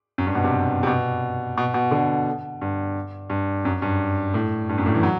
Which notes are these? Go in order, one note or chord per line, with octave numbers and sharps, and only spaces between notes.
F#2
G2
B2
C3
C3
B2
B2
B2
D3
G2
G2
F#2
G2
A2
G2
F#2
A2
E3
F#3